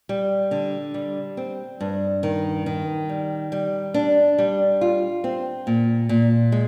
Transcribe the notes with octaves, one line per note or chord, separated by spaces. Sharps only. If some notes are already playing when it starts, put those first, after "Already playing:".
G3
D3
G3
C4
G2
D#3
D#3
G3
G3
D4
G3
F4
C4
A#2
A#2
G#3